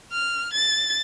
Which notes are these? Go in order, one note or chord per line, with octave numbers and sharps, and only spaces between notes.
F6
A6